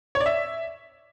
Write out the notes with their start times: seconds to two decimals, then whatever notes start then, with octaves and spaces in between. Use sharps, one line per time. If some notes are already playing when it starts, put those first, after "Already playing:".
0.15 C#5
0.20 D5
0.26 E5